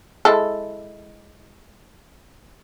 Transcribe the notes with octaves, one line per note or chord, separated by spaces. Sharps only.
G#3 E4 A4